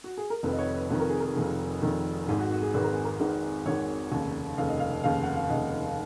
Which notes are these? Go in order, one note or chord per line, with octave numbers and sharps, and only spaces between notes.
F#4
G#4
A#4
F1 F2 D#3 B4
D#5
C#5
B4
F1 F2 D#3 B4
A#4
G#4
A#4
F1 F2 D#3 G#4
F1 F2 D#3
G#1 G#2 D#3 G#4
F#4
F#4
G#4
G#1 G#2 D#3 B4
A#4
G#4
A#4
G#1 G#2 D#3 B4
G#1 G#2 D#3 C#5
F1 D#2 C#3
F1 D#2 C#3 F5
D#5
F5
F1 D#2 C#3 F5
F#5
F5
F1 D#2 C#3 D#5